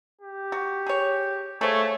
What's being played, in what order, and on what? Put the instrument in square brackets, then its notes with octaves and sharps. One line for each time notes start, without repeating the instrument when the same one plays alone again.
[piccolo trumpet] G4
[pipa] F#4
G#4 C#5
[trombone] A3 [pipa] G#4 C5 F5 [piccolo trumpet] C#5